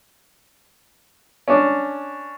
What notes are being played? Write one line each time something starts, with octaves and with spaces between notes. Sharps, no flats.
C#4 D4